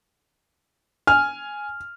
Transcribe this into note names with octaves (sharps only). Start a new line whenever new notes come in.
G#5 F6